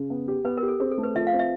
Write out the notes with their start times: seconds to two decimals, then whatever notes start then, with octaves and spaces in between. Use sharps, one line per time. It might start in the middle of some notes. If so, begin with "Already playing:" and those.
Already playing: C#3
0.10 B3
0.28 G4
0.45 B3 B4
0.57 G4 A#4
0.68 A4
0.80 C4 G#4
0.91 A4
0.98 A3
1.03 B4
1.15 F3 E5
1.27 F5
1.33 C4
1.39 E5